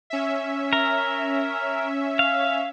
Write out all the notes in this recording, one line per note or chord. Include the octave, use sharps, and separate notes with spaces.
C#4 E5
A#4
F5